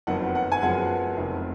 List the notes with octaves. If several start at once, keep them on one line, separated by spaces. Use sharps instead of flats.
F#1 F2 D#3 F#3 B3 F#5
F#5
G#5
F#2 F3 G#3 B3 F#5
F1 F2 D#3